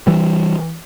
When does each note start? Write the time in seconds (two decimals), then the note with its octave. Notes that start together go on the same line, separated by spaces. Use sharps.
0.07 E3 G3